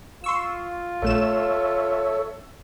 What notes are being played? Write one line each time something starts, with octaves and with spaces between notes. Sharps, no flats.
F4 C6 C#6 E6
A#1 A3 A4 C#5 E5 E7